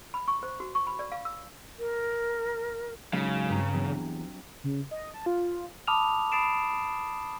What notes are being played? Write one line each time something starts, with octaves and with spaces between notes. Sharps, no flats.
B5
C#6
C5
F#4
C#6
B5
D5
F5
E6
A#4
G#2 C#3 F#3 F5
G2 C4 A#5
E2 F#3
C#3
D#5
A5
F4
A5 B5 D6 D#6 F6 F7
B5 D#6 A6 C7 D7 E7